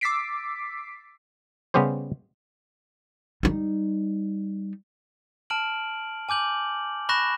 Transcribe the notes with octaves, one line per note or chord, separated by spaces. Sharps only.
D6 E6 A6 B6 C7 D7
C#3 G3 B3 C#4 G4 C5
G3 D#4
A5 F6 D7 F#7
G#5 D6 G6 F#7
B5 C#6 F#6 A#6 E7